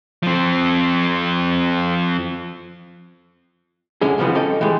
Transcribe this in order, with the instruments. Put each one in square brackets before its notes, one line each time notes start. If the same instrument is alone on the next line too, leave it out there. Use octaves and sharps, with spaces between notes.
[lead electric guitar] F3 C4
[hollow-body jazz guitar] F#2 D3 G#3 C#4 G#4
C#3 E3 F3 G3 B3 C4
C#4 A4 D#5 G5
E3 G3 G#3